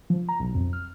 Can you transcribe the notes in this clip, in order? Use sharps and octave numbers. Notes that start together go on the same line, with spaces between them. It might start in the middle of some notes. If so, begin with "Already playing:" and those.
F3
A#5
B1
F2
F6